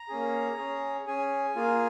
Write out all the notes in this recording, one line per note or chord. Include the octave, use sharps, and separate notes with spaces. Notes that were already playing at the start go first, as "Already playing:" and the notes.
Already playing: A#5
A#3 C#4 G#4
C#4 G#4
C#4 G#4 G#5
A#3 F4 G#4